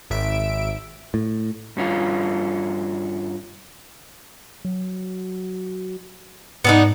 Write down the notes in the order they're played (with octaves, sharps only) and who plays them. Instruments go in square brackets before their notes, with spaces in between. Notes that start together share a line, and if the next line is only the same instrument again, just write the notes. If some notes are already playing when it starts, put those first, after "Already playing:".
[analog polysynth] G#1 E5 D7
[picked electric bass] A2
[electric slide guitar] G2 C#4 F4
[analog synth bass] F#3
[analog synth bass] G#2 [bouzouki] B3 D4 D#4